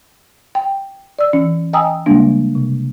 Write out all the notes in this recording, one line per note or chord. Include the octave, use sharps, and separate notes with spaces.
G5
D5 E6
E3 C#4
D#5 G5 G#5 A#5 D#6 E6
C#3 G3 G#3 A#3 D4
C3